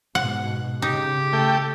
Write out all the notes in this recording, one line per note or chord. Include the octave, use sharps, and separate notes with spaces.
G#2 B2 F#5
C#3 D#4 G4
A3 G5